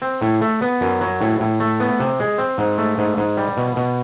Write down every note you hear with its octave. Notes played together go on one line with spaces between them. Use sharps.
C4
A2
A3
B3
F#2
F#3
A2
A2
A3
B3
C3
G#3
C4
G#2
A3
G#2
G#2
G3
B2
B2